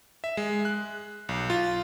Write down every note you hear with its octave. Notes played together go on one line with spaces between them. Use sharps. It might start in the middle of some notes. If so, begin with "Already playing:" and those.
E5
G#3
F#6
B1
F4